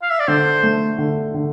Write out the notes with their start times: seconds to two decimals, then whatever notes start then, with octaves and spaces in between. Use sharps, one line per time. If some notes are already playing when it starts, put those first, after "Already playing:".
0.02 F5
0.11 E5
0.20 D5
0.28 D3 C5
0.63 A3
0.98 D3
1.34 D3